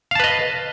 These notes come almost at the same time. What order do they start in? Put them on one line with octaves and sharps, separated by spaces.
F5 A5 B4 D#5